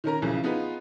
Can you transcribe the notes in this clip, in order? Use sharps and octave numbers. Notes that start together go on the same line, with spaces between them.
D#3 C#4 A#4 A#5
B1 C#3 E3 F3
B3 D#4 F4 G#4 B4